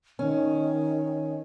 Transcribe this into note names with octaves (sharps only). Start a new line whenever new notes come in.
D#3 C#4